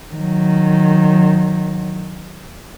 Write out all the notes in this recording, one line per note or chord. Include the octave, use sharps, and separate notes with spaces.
D#3 F#3